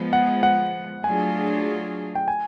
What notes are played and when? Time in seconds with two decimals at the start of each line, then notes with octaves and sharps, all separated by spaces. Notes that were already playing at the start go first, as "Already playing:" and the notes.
Already playing: F3 G#3 B3
0.13 F#5
0.43 F#5
1.04 F#3 A3 D4 F4 G#4 G#5
2.15 G5
2.28 G#5